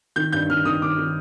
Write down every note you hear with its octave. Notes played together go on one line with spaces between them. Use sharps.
D#3 G6
G2 G6
D#3 F6
D#3 D#6
D#3 D6
D#3